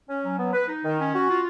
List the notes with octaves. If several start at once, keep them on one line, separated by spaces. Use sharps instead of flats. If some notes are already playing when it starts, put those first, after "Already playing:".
C#4
F#3
B3
B4
D#4
D#3
C#4
F#4
F4